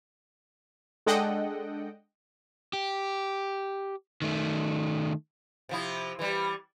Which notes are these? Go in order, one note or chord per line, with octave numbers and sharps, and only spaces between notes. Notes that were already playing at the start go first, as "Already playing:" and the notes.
G#3 D4 A4 D#5 F#5 G5
G4
D#3 A3
C3 F3 E4
E3 G3